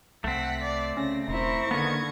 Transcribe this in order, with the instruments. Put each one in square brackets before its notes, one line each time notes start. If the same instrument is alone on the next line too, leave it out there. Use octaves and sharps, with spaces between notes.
[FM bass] C2 [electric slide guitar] A3 C4 [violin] F#5 B6
[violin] D5
[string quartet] C#3 [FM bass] C#4 [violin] A#6
[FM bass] E1 [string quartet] E4 A#4 C5 [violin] C#6 A#6
[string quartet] D3 G#6 [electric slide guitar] D#3 B3 [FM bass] A#3